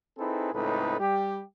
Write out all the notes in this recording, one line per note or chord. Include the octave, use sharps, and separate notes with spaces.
C4 D#4 E4 G#4 A4 B4
C#2 A2 C4 D#4 A4 B4
G3 G4